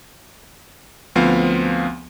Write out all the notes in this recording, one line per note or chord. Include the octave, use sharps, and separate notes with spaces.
D2 F3 B3 C4 F5